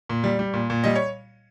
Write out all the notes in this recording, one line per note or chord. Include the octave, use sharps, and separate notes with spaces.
A#2
G3
G3
A#2
A#2
G3 D#5
C#5